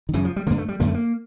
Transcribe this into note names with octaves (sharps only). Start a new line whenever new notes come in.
D#3
F#2 C#3 E3
F3
G3
G2 D3 A#3
A3
G3
F#2 D3 A#3
A3
A#3